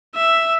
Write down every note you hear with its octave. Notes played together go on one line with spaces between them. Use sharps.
E5